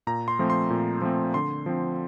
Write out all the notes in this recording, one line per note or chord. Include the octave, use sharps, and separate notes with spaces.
A#2 A#5
C6
F3 A3 C4
C6
A#2
F3 A3 C4
D3 C6
F3 C4